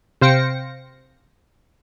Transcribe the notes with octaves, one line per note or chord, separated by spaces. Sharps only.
C3 C5 F5 G5 A#6 C#7